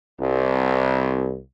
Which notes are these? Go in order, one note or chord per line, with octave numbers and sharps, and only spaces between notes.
C2